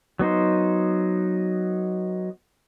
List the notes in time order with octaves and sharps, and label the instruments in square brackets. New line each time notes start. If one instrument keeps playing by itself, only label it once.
[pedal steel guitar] F#3 B3 D#4 C5